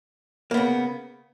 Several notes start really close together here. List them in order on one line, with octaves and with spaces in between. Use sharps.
A#3 B3 C#3